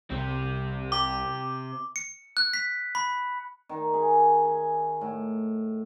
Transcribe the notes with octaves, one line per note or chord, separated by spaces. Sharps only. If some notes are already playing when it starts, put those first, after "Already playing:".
C2 C3 C4
G4 D6
C#7
F#6
B6
B5
D#3
G#4
G#5
A2